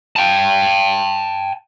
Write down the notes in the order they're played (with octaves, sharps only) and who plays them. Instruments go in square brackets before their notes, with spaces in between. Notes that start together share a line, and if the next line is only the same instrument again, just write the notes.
[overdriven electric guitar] G5 A5